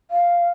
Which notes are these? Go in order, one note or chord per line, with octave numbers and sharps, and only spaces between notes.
F5